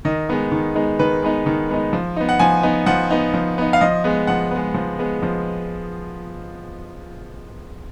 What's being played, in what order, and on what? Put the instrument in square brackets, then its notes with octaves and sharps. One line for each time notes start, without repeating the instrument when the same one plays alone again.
[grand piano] D#3 D#5
G#3 B3 D#4
D#3
G#3 B3 D#4
D#3 B4
G#3 B3 D#4
D#3
G#3 B3 D#4
F3
B3 D#4
F#5
F3 G#5
B3 D#4
F3 F#5
B3 D#4
F3
B3 D#4
F5
F3 D#5
G#3 B3
F3 F#5
G#3 B3
F3
G#3 B3
F3